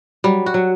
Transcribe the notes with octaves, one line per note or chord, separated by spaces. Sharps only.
F#3 G3
F#4
F#3